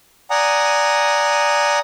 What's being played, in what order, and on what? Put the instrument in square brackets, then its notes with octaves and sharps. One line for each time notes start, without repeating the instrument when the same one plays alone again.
[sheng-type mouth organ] D5 F#5 G#5 A#5 D#6